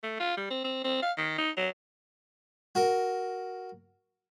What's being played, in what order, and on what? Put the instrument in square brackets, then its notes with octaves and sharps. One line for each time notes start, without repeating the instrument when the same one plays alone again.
[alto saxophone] A3
F4
G3
C4
C4
C4
F5
D#3
D#4
F#3
[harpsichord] F#4 A#4